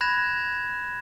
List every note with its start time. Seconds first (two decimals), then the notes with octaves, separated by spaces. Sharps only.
0.01 B5 F#6 G#6 A#6 E7